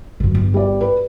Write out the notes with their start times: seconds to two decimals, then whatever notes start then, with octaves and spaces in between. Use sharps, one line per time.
0.20 F#2 D3
0.34 G1
0.54 G3 D5
0.81 B4